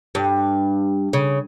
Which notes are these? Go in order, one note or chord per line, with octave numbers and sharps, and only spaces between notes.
G2
C#3